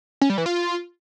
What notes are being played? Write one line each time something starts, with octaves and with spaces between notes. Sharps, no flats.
C#4
G3
E3
F4